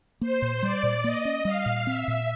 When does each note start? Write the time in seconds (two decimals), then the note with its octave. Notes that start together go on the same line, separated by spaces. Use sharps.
0.21 A#3 C5
0.42 A#2
0.62 G3 D5
0.83 A#2
1.04 A#3 D#5
1.25 C#4
1.45 G3 F5
1.66 A#2
1.86 C4 E5
2.08 A#2